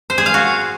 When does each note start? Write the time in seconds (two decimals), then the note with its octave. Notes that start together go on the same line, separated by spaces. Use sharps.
0.10 C5
0.18 G#4
0.26 F5
0.34 F#4